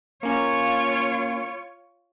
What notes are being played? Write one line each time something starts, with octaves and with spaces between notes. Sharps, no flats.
A#3 C#4 F4 C#5